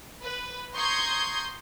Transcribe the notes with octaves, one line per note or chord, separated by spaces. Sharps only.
B4
A#5 C6 C#6 D#6 G6 G#6